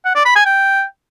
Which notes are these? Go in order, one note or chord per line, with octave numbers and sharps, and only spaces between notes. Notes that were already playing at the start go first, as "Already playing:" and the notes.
F#5
D5
B5
G#5
G5